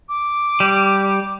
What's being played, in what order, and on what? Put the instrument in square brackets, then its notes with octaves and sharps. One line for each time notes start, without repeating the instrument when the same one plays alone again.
[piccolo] D6
[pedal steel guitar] G3